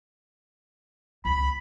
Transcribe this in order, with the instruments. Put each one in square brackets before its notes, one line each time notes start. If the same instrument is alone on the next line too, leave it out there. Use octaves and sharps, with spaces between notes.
[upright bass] C#2 [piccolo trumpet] B5